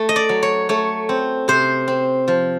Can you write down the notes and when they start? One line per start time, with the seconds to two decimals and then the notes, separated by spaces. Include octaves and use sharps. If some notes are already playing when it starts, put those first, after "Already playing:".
Already playing: A3
0.09 D#5
0.16 D5
0.29 F#3
0.43 C#5
0.69 A3 C#5
1.09 C4
1.48 C3 C5
1.88 C4
2.28 F3